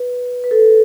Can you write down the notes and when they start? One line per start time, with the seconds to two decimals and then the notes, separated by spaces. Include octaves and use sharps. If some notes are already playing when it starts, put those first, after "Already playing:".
Already playing: B4
0.44 B4
0.51 A4